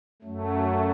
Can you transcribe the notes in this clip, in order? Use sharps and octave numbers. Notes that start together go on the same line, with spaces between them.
F#2 F#3 A3